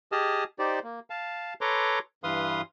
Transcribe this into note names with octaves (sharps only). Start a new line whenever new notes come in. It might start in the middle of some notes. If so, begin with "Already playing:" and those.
G4 G#4 D#5 A5 D#6 F6
D#4 G4 C5 D5
A#3
F5 A5
A4 B4 C#5 A#5 C6 D6
G2 E3 B4 F5 C6 D#6